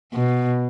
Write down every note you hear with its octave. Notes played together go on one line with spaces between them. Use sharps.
B2